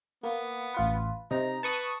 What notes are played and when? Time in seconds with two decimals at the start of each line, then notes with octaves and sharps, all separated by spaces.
0.23 A#3 B3
0.74 A1 F4 B4
1.31 C3 D#4 A#5
1.63 B4 A5 C#6 D#6